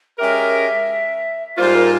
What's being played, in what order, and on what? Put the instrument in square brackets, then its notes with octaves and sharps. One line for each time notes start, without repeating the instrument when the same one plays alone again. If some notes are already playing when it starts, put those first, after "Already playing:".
[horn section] G#3 C#4 G4 A#4 [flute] E5
[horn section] G#2 G3 A#3 F4 [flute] C5
[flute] A#4